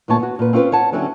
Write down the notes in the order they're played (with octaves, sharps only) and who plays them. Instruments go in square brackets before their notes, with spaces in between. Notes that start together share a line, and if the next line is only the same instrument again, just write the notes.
[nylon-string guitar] D2 A#2 B3 C#5 A5
B3 F#4
A#2 B4
C4 C#4 F4 F#4 B4 C5
C#5 F#5 A5
D3 F#3 C4 C#4 E4